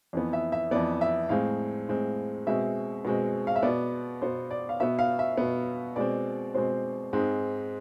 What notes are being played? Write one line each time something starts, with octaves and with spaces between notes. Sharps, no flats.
F2 E3 B3
E5
E5
F2 E3 B3 D5
E5
A2 G#3 C4 F5
A2 G#3 C4
B2 G#3 C4 E5
B2 G#3 C4
F5
E5
B2 B3 D5
B2 B3 C5
D5
F5
B2 B3 E5
F5
E5
B2 B3
B2 G#3 C4 D5
B2 G#3 C4 C5
G#2 G#3 C4